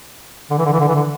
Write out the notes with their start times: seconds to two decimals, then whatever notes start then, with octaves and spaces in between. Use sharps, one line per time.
0.51 D3
0.58 E3
0.66 D3
0.73 E3
0.80 D3
0.88 E3
0.95 D3